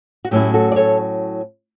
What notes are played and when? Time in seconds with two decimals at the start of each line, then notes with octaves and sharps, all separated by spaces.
0.25 F#4
0.31 A2 F#3 C#4 E4 G4
0.54 F#4 A4
0.72 D5
0.76 A4 C#5